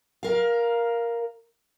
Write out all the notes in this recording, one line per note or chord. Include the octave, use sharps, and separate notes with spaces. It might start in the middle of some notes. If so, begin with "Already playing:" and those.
A#4 F5